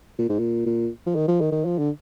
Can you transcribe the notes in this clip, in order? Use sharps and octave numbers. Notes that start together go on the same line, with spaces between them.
A#2
G#2
A#2
A#2
F3
D#3
F3
D#3
D#3
F3
D3